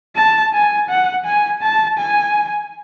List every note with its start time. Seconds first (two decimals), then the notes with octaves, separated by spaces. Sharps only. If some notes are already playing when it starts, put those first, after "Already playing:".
0.16 A5
0.54 G#5
0.89 F#5
1.25 G#5
1.62 A5
1.98 G#5